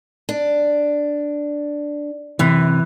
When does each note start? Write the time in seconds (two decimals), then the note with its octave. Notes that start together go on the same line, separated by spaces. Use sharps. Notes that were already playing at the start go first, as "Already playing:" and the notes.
0.29 D4
2.39 F#2 C3 E3